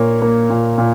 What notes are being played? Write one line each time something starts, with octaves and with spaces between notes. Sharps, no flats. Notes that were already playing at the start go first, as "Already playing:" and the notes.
Already playing: A#2 A#3 C#5
A#3
A#2
A#2